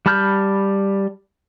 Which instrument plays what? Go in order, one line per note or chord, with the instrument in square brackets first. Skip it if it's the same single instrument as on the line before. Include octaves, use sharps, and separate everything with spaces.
[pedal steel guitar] G3 A5 B5 F6 G6